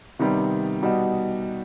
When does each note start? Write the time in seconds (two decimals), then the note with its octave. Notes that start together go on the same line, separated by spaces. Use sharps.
0.19 C3 D#3 G3 B3
0.82 B2 G3 D#4 F#4